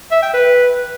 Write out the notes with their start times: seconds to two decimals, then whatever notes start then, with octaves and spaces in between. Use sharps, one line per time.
0.11 E5
0.22 G5
0.33 B4